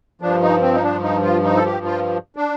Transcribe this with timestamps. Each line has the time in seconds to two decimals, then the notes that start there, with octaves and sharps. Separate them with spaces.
0.21 G2 F3 D4
0.42 D#4
0.62 C4
0.74 D#4
0.83 D4
1.03 D#4
1.23 F4
1.44 D#4
1.57 A4
1.65 G4
1.86 F4
2.36 D4